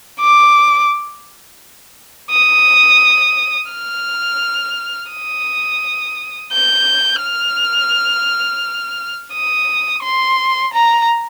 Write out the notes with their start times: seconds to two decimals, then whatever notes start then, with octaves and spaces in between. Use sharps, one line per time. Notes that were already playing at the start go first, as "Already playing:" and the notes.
0.20 D6
2.31 D#6
3.71 F6
5.11 D#6
6.52 G6
7.22 F6
9.33 D#6
10.03 C6
10.74 A#5